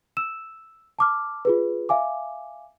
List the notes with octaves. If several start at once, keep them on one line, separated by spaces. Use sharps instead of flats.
E6 E7
A5 D6 F6
F4 G#4 B4
E5 F5 G#5 D6